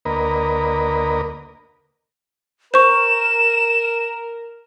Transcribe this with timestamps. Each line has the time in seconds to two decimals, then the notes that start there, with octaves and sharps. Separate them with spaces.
0.05 D2 A#3 A#4 B4 D#5
2.74 A#4 C5 C#6 E7